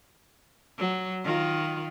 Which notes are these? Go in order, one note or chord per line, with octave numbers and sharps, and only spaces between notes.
F#3
D#3 F4